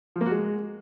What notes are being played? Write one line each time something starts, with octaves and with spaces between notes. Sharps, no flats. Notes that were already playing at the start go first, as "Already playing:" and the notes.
F3
A#3
F#4
G#3